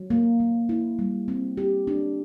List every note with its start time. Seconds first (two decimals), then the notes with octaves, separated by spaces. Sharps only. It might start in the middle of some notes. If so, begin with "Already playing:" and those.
Already playing: F#3
0.10 A#3
0.40 F#3
0.69 E4
0.99 G3
1.28 C4
1.57 G4
1.87 D4